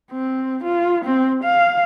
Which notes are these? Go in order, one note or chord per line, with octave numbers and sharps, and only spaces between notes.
C4
F4
C4
F5